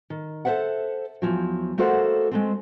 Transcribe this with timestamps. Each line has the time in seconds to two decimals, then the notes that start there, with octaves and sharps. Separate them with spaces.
0.10 D#3
0.45 A4 A#4 C5 E5 F#5
1.22 E2 F3 F#3
1.78 A3 A#3 F#4 A4 C5 F#5
2.31 G#3 A3 C4